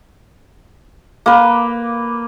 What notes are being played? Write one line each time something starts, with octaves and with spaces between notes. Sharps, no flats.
A#3 B4